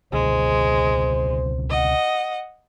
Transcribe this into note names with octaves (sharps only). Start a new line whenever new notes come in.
C#2 B2 D3 G#3 C5
D#5 F#5